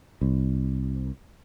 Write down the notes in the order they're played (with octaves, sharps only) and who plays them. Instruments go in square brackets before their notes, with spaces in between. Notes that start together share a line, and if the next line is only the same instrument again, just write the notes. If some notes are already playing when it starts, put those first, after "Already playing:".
[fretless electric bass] C2